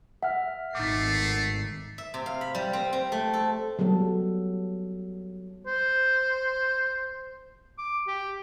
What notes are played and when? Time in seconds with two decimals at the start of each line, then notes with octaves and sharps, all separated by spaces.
0.23 E5 F#5 F6
0.75 G#1 A3 D#4 D6 C7
1.98 E5
2.14 C3
2.26 F5
2.41 B5
2.55 G3
2.73 C4
2.93 C4
3.12 A3
3.34 A4
3.79 F#3 G3 B3 A4
5.66 C5
7.78 D6
8.07 G4